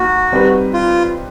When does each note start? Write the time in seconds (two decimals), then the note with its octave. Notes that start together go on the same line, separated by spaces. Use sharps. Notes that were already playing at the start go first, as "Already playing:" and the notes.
Already playing: A#3 D#4 F#4
0.32 G3 C4 D#4 G4 B4
0.74 F4